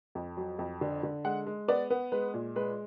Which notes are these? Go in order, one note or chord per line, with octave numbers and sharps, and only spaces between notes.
F2
F#3
F2
D3
D3
G#3 F#5
G#3
B3 D5
B3
G#3 B4
A#2
G#3 B4